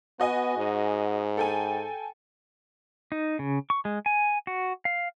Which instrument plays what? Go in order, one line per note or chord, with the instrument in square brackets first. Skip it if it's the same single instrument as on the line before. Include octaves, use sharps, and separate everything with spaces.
[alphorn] B3 [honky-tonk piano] F#4 D#5 G#5
[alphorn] G#2
[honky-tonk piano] A4 G5 G#5
[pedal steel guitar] D#4
C#3
C#6
G#3
G#5
F#4
F5